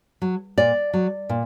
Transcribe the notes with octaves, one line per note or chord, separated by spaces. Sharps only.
F#3
A#2 D5
F#3
A#2